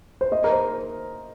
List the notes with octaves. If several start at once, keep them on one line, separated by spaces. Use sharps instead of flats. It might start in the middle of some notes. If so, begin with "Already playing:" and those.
C5
A#3 D#5
A#4
C5